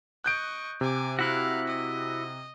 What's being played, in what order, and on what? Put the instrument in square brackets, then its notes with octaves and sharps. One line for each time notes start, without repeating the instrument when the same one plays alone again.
[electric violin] D#5 C#6 [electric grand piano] F#6 G6 D7
[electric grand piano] C3 [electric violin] G#5 D6
[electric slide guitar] E4 F#4 [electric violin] F5 F#6
[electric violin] D#5